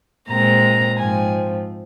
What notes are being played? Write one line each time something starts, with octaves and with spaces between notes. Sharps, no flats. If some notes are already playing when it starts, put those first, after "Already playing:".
A#2 G#3 C4 A#5
G#2 F3 C4 G#5